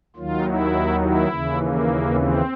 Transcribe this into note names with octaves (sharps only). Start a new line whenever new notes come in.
D#2 D#3 F#3 F4
E4
E4
D#2 C#3 E3
A#3
C4